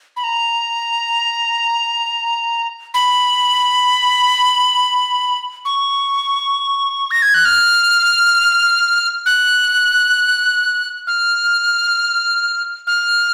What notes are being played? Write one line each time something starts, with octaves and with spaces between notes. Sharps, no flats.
B5
A#5
B5
C#6
A#6
G#6
F#6
F6
F#6
F6
F6